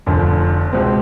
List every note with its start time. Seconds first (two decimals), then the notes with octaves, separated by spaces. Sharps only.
0.06 F1 F2 D3
0.73 C#2 B2 G#3 C4